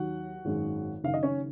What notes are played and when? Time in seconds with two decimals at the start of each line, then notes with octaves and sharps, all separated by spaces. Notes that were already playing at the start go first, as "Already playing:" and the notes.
Already playing: D#2 D#3 F#3 F#4 F#5
0.45 G#1 F#2 D#3 G#3
1.03 F#1 F#2 D#3 F5
1.14 D#5
1.23 C#4 C#5